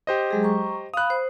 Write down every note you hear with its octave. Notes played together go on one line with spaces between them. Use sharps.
G4 C5 D#5
F#3 G#3 G#4
A#5 C#6
F5 B5 D#6 F#6
C5